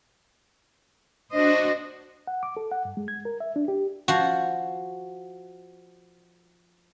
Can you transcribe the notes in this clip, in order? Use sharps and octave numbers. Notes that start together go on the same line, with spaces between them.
D4 F#4 C5 D#5
F#5
D6
A4
F#5
G2
G#3
G#6
A#4
E5
D4
G4
F3 F#4